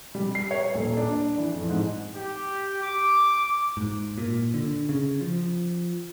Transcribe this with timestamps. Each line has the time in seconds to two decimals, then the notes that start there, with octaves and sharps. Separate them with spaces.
0.15 G3
0.35 C7
0.51 C#5
0.74 D#1
0.97 D4
1.38 E3
1.54 F2
1.70 G#2
2.14 G4
2.82 D6
3.77 G#2
4.18 A#2
4.54 D3
4.89 C#3
5.21 F3